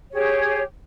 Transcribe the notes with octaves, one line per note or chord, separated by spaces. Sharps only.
G4 G#4 C#5